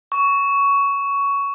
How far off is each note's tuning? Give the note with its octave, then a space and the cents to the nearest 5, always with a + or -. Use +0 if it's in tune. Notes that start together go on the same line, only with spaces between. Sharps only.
C#6 +15